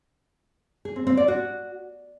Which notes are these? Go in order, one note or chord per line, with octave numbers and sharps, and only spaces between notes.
G#4
C4
C4
D5
F#4